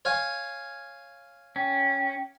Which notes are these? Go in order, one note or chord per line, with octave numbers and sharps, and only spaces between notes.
C#5 F5 G#5
C#4 G5